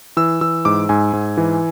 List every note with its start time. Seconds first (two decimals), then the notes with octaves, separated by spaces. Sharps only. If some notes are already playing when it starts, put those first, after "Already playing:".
0.17 E3 E6
0.41 E3 E6
0.65 G#2 D6
0.89 G#2 G#5
1.13 G#2
1.37 E3